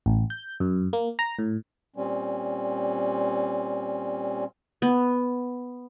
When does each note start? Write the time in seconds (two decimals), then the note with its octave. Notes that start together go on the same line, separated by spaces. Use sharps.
0.06 A1
0.30 G6
0.60 F#2
0.93 A#3
1.19 A#5
1.39 A2
1.96 A#2 G3 C4 C#4
4.82 B3